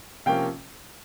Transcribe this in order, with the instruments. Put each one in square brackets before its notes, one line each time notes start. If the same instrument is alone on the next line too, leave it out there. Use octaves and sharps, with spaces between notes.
[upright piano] C3 F3 A#3 C#4 F5 G5